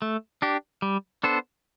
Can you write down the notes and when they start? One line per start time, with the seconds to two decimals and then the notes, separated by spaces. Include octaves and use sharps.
0.02 A3
0.42 D4 G4
0.82 G3
1.23 B3 D4 A4 C5